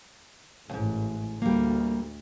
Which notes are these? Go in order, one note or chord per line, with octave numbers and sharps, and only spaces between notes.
A1 D#2 G#2
D2 G3 A#3